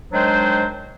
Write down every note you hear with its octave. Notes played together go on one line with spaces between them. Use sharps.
D#3 F#3 G#3 D4 C5